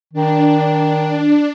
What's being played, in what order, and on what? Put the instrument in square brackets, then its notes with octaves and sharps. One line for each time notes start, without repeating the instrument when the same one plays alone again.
[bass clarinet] D#3 [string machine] D4